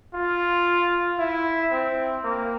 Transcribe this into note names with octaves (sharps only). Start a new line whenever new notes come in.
F4
E4
C4
A#3